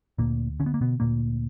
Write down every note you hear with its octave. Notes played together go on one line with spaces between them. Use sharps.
D2 A#2 A#3
D3 C#4
B3
A#3
B2 B3
D2 A#2 A#3